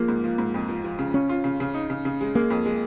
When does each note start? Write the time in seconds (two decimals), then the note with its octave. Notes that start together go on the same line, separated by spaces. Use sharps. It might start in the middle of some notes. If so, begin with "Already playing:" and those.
Already playing: F3 G#3 A#3
0.08 G#2
0.24 F3
0.38 G#2
0.54 F2
0.69 F3
0.84 F3
0.99 C#3
1.14 C#3 C#4
1.29 F4
1.44 C#3
1.60 C#3
1.74 D#4
1.90 C#3
2.05 C#3
2.21 G#3
2.35 G#3 A#3
2.50 F2
2.66 G#3